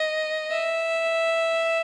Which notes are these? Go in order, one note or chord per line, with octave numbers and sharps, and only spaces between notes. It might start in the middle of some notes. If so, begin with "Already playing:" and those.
Already playing: D#5
E5